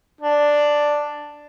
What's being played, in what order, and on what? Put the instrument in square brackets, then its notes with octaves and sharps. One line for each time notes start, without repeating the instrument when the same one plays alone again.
[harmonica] D4